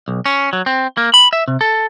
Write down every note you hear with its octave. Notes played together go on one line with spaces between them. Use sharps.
B1
C#4
F#3
C4
A#3
B5
E5
C3
A4